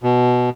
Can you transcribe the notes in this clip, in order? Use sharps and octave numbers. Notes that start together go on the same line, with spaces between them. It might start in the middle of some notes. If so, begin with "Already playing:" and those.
B2